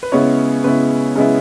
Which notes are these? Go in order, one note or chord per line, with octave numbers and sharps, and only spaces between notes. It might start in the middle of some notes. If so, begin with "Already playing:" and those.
B4
C#3 G#3 B3 E4 C#5
C#3 G#3 B3 E4 B4
C#3 G#3 B3 E4